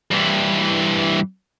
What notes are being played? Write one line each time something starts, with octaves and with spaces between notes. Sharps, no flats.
G2 E3